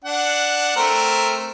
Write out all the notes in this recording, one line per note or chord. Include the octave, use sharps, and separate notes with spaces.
D4 F#5
A3 C4 A#4